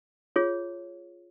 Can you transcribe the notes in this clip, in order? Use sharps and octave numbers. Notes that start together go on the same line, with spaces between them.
F4 G#4 C#5